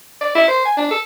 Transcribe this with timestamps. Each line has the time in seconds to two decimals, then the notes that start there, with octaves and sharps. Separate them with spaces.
0.21 D5
0.36 E4
0.48 C5
0.66 G#5
0.77 D4
0.91 A4